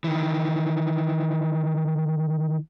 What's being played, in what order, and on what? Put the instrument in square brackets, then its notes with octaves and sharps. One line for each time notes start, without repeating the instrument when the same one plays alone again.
[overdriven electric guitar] D#3 E3